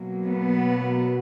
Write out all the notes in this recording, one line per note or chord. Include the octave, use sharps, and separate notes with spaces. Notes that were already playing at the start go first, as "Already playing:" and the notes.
Already playing: B2 F#3 A#3
B3